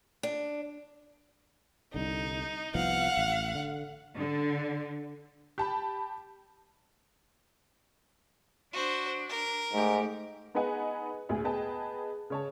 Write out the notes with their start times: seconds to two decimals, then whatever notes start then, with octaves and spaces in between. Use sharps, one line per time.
0.23 D4
1.94 C2 D3 D#4
2.75 C2 F3 B3 F5 F#5
3.17 A1
3.55 D3
4.17 D3
5.58 G4 A5 B5
8.73 D4 F#4 C5
9.29 A#4
9.73 G#2 A3 G4
10.55 B3 D#4 G#4 B4 F#5 G#5
11.29 D2 A#2 G#4
11.44 B3 G#4 B4 D#5 G5 A5
12.30 C#3 C#5 A5